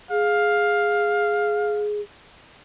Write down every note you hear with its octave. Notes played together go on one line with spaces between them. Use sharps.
G#4 F5